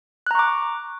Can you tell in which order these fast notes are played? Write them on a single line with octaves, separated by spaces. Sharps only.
F#6 A#5 C#6 D6